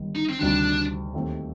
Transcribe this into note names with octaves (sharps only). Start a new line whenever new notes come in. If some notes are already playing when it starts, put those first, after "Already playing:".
Already playing: G1 G2 D#3
D#4
C4
D2 C3 D#3 G3 D4
D#2 D#3 A3 C4 G4